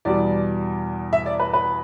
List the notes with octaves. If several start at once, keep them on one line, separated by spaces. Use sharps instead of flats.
E2 B2 G3 D5
E5
D5
B4
B4